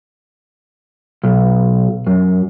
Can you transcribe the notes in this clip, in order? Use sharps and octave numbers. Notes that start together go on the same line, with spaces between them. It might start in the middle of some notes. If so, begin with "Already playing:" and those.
B1
F#2